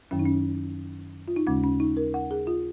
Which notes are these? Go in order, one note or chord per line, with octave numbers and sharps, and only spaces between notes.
F#2 D#3 F#3 C#4
D#4
C#4
F4
D#4
D#2 C#3 G#3 C#4
C#4
D#4
A#4
F#5
G#4
F4